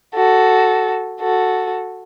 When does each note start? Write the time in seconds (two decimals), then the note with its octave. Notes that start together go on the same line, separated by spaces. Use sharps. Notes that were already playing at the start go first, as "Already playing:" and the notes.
0.15 F#4 A4
1.20 F#4 A4